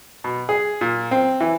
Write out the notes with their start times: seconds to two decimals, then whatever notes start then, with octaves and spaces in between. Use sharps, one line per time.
0.24 B2
0.49 G#4
0.81 A#2
1.11 C4
1.41 E3